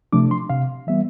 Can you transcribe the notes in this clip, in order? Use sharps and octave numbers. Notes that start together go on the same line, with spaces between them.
C3 F3 A3 D4 D6
C6
C3 F5
E3 G3 B3 E5